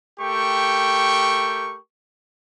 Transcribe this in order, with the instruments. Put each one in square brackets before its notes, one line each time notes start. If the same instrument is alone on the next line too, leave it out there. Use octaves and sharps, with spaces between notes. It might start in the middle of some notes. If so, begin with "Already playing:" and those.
[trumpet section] A3 G4 A#4 G5 C#6